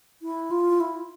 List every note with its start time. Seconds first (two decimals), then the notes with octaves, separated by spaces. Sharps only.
0.22 E4
0.51 F4
0.80 E4